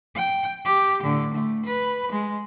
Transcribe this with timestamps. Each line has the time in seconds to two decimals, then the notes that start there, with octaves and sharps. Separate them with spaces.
0.15 G5
0.65 G4
1.03 A2 D3
1.34 A3
1.66 B4
2.11 G#3